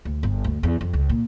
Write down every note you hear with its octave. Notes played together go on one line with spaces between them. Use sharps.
D2
G1
D2
E2
F2
C#2
A#2